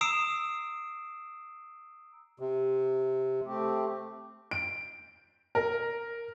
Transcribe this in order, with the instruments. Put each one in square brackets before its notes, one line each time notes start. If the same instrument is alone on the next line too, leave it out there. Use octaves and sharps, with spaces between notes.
[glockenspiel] A#5 D#6 E6 C7 D7 E7
[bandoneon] C3
[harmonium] A3 C4 G4
[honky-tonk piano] D7
A#4